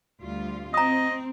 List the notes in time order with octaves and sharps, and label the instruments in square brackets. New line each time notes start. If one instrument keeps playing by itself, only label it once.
[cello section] D2 G3 F4
[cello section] C4 [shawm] D#5 [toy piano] A#5 D#6